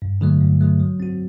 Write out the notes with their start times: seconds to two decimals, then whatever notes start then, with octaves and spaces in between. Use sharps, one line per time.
0.02 G2
0.21 D3 F#3 A3
0.41 G2
0.61 D3 F#3 A3
0.80 F#3
1.00 C4 F#4